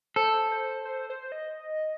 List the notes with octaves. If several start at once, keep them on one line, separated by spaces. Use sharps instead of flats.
A4 C5
C5
C5
C5
D#5